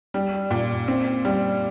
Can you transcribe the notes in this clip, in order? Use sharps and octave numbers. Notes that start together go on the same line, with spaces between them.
G3
A#2
C4
G3